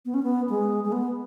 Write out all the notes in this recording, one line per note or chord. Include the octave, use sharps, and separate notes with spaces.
B3
C#4
B3
G#3
G#3
B3